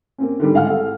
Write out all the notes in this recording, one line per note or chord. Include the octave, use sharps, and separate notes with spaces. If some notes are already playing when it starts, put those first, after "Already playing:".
A#3 C4 C#4
D3 D#3 G3
A2 G#3 F5 F#5 F6
A4 F5